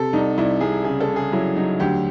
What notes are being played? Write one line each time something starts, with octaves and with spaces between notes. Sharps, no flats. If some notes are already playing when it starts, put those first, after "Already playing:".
Already playing: C3 A4
C2 D#4
C2 E4
C2 G#4
C#3 G#4
A4
C#3
G#4
F#3 E4
F#3 D#4
D2 G4